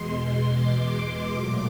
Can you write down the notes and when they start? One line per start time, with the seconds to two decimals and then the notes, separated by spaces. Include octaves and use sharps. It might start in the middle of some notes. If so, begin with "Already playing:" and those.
Already playing: E2 B2 G#3 C6
0.51 D6
1.32 A#2 F#3 A3